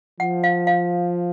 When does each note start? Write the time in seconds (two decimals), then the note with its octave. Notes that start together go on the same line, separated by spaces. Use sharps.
0.20 F3 F#5
0.44 F5
0.67 F5